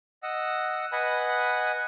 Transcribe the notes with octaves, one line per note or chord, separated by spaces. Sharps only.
D#5 F#5 E6
B4 D#5 F#5 G#5 B5